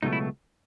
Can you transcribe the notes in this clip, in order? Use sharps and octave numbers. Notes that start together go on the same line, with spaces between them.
C#2 B2 F#3 A3 D#4
E4